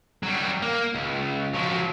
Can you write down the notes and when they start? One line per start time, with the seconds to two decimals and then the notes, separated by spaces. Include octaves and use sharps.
0.23 F#3 G3
0.62 A#3
0.94 C#2
1.54 F3 F#3